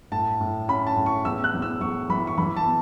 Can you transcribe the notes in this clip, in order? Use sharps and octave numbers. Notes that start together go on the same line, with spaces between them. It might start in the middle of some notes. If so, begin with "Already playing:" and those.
A2 A5
A2
C#4 B5
A5
A2
C#6
E2 E6
F#6
E2
E6
E2 C#6
E3 B5
C#6
E3 B5
A5
B3